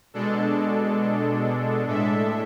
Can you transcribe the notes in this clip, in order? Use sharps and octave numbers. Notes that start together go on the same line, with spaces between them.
B2 G#3 D4 A4
A2 G#3 D4 A4 E5